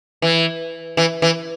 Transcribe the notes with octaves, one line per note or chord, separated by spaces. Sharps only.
E3
E3
E3